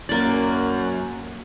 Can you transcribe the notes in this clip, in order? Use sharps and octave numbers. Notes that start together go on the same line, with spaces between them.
F#2 A#3 D5